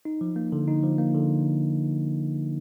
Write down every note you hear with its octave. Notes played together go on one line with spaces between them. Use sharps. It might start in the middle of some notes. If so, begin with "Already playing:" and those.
D#4
F3
A#3
D3
D#4
F3
A#3
D3